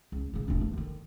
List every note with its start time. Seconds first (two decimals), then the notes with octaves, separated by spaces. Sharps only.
0.12 C#2
0.33 C#2 C#3
0.48 E1 D4
0.61 D#2
0.73 D3 D#3